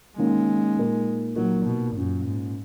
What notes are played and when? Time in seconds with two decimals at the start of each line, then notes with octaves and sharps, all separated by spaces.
0.17 D#3 G#3 A#3 C#4
0.77 A#2 A#3 D#4 A#4
1.36 A#2 F#3 A#3 D#4 A#4
1.66 B2
1.95 F#2 A#2 A#3 C#4
2.25 G#2